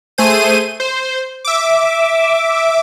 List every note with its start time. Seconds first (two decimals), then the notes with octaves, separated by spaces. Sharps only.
0.18 A3 G#4 C5 D#7
0.80 C5
1.45 E5 D6